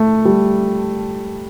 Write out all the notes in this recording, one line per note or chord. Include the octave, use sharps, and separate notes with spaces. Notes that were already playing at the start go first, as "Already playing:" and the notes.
Already playing: A3
G3